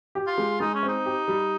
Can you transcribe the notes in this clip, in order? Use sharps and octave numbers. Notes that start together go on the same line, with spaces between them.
G4
F4
G#3
G#3 D#4
C#4
C4
D#4
G4
G3